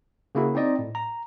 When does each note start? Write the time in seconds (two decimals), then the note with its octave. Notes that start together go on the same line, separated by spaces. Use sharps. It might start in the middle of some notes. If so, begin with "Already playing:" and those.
0.35 C#3 A#3 E4 F#4
0.55 C4 D#4 D5 D#5
0.79 A2
0.95 A#5